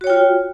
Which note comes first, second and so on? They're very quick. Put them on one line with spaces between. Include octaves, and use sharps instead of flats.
F#4 C#5 G5 F4